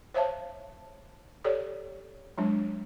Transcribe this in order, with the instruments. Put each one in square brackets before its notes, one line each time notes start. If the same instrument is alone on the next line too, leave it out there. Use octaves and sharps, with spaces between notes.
[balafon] C5 C#5 E5 F5 A5
G4 A4 C#5 D5
F#3 G#3 D4